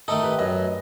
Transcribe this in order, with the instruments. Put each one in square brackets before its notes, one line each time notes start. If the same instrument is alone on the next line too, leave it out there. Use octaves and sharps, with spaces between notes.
[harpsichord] D#3 A3 D#4 [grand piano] A4
[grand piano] G4 B4
[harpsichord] F#2 [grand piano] B4 D#5